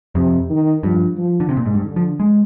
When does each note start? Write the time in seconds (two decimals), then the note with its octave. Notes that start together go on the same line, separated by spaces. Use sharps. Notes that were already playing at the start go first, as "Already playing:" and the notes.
0.15 F2 C3
0.49 D#3
0.83 G2 F3
1.18 F3
1.40 D3
1.49 C3
1.57 A#2
1.66 G#2
1.74 G2
1.85 D3
1.96 F3
2.20 G#3